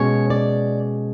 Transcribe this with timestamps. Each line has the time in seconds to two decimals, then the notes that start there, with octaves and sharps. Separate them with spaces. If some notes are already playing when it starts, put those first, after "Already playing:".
Already playing: B2 G#3 C#4 C#5
0.30 D5